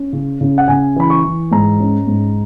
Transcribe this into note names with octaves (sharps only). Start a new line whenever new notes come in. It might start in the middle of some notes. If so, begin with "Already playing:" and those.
Already playing: C#4
C#3
C#3
F#5
C#3 G#5
E3 B5
C#6
E3
G#2 A#5
C#4
G#2